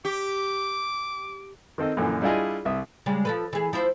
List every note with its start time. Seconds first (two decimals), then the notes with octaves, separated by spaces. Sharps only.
0.05 G4 D6
1.78 D#3 C4 A4 D#5
1.97 F#2 A#2 D3 E3 F3
2.22 G3 D4 E4 F4 G#4 D#5
2.65 C2 E5 D#6
3.06 C#3 G3 G#3
3.25 F3 A4 B4
3.53 E3 G#4
3.73 F3 E4 C5